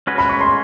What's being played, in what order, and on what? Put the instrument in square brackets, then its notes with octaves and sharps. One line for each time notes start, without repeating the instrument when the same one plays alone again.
[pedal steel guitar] G#3 C#4 F#4 B4
[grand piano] B5
C#6
C6